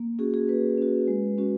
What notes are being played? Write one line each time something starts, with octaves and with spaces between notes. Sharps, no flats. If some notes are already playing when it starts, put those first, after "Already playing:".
Already playing: A#3
C#4 F#4 G#4
G#4
A#3 B4
C#4 F#4
G#3
C#4 F#4